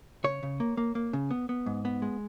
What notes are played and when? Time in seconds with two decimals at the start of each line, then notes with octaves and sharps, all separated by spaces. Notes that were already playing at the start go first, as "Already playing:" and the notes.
0.24 C#3 C#5
0.43 C#3
0.60 A#3
0.77 A#3
0.95 A#3
1.13 C#3
1.31 B3
1.49 B3
1.66 G#2
1.85 B3
2.02 G#3